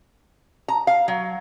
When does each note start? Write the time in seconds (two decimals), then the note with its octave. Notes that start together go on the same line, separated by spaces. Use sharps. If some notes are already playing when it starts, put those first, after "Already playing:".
0.68 A#5
0.87 F5
1.08 F#3